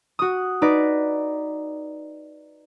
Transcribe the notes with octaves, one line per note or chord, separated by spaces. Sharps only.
F#4 D#6
D#4 B4 D5